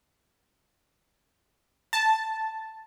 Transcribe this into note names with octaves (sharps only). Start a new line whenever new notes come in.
A5